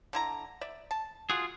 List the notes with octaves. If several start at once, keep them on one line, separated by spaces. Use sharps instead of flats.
D3 E4 A#5
D5 E5
A5
F4 F#4 G#4